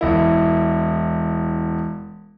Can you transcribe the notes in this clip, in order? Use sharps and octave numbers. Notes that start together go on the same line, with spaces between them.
E1 E4